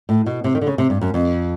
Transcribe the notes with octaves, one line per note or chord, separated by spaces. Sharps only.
A2
B2
C3
D#3
D3
C#3
C3
G2
F#2
F2